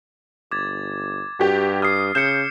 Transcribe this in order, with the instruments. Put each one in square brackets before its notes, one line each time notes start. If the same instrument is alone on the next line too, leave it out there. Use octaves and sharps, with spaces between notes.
[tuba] G1 [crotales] D6 G#6 A6
[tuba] G2 [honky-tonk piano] F#4 G4
[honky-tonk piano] D#6 [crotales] F6 C7
[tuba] C#3 [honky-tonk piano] G6 [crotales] C#7 E7